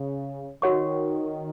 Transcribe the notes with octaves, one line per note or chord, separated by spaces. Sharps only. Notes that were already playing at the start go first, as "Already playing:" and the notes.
Already playing: C#3
D#3 F#4 C#5 F#5 C#6